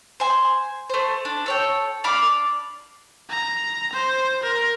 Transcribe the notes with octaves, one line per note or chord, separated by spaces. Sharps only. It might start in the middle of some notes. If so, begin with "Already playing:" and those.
C5 G#5
A3 C5
D4
A4 C#5 G5
D4 F5 B5 D6
A#5
C5
A#4